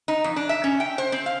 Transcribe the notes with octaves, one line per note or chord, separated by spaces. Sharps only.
D#4
F2
D4
E5
C#4
G5
C5
C4
F5